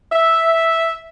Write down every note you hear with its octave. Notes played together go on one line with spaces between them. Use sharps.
E5